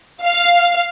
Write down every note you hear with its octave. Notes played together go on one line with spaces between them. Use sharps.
F5